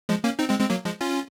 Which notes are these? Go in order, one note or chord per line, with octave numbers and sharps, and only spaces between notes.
F3 G#3
A#3 C#4
C4 D#4
G#3 C4
G#3 C4
F#3 A#3
F3 G#3
C#4 F4